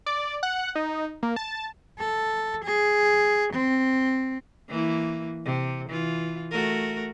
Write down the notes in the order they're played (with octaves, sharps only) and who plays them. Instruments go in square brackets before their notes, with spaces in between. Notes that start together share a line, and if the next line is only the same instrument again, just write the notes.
[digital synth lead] D5
F#5
D#4
A#3
A5
[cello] A4
G#4
C4
[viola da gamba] E3 A#3 E4
C3
E3 F4
A3 F#4 A#4